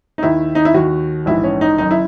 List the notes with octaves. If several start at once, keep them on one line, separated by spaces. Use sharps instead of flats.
D#4
D#2 D#3 E4
D#4
E4
D#2 D#3 F#4
A#1 G#2 E3 E4
C#4
D#4
F#1 F#2 D#3 D#4
E4